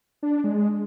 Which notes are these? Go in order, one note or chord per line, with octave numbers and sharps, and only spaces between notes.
D4
D4
G#3